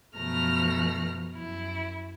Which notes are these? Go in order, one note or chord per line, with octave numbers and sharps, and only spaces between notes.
F#2 B2 F3 A3 A#5 F6
F#2 E4